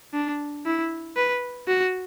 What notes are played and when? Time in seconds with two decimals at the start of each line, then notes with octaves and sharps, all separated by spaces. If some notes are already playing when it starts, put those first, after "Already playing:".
0.14 D4
0.66 E4
1.16 B4
1.68 F#4